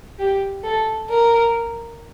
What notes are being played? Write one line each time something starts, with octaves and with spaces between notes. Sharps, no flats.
G4
A4
A#4